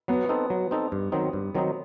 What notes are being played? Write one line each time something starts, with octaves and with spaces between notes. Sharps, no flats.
F#3 B3
C4 D#4 A4
F#3
C4 D#4 A4
G2
D#3 F#3 C4 D#4
G2
D#3 F#3 C4 D#4